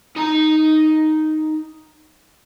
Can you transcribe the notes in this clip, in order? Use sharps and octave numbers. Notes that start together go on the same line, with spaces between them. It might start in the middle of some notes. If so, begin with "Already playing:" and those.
D#4 A#5